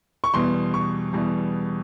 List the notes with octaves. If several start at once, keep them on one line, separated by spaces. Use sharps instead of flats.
C#6
E2 B2 G3 C6
C#6
E2 B2 G3